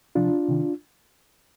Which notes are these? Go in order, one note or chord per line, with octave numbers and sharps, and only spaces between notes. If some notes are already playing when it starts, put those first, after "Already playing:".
C3 F3 D4 F4
C3 D#3